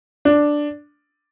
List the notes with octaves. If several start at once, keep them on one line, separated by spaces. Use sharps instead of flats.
D4